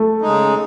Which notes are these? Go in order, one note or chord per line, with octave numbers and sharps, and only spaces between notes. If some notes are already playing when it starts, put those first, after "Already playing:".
Already playing: A3
C#3 G#3 D#4